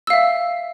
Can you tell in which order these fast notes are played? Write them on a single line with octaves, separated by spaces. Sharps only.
E6 F5 E5